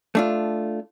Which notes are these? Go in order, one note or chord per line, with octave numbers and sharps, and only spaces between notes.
A3 D4 F4